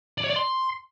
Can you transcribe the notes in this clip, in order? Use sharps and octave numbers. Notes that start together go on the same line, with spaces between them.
D5
C#5
D5
C6